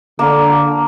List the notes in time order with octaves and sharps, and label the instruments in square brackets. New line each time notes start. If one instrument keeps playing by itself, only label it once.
[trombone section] D3 [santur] A#3